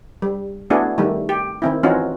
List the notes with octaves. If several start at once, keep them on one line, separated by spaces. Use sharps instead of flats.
G3
A3 B3 D4 E4 F#4 G#4
D#3 G3 A3
G4
D#3 C4 E4
E3 C4 C#4 D#4 F4 F#4